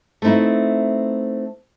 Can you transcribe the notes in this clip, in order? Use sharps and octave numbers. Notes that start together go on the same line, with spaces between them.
A3 B3 C4 D#4 E4